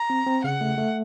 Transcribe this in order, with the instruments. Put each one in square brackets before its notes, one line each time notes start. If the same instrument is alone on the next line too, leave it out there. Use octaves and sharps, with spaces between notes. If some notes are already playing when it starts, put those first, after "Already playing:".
Already playing: [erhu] A#5
[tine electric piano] C4
C4
[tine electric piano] C#3 [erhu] F#5
[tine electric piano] A3
A3